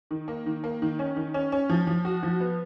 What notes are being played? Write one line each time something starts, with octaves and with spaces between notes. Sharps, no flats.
D#3
A#3
D#3
A#3
D#3
C#4
D#3
C#4
C#4
F3
F3
F#4
F3
B3